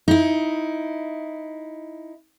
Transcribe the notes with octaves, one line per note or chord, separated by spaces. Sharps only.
D#4 E4